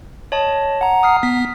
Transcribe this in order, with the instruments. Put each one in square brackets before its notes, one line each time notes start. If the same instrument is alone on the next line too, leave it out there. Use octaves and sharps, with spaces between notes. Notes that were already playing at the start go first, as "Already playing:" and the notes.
[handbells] C#5 D#5 A5
[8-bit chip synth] F#5 A#5
[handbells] D#6 F6 C7
[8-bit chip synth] B3 [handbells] B6